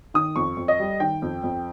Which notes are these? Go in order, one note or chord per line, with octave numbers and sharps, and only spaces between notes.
D#3 D#6
F2 C#6
F2
D#5
G3
D#3 G5
F2
F2